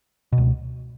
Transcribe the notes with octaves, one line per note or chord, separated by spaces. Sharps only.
B2
C#2